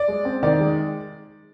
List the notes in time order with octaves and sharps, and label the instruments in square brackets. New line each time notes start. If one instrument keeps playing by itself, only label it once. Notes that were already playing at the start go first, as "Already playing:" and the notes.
Already playing: [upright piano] D5
G#3
C4
D#3 D5
G#3